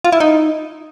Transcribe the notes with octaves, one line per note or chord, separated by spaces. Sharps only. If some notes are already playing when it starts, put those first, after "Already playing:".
F4
E4
D#4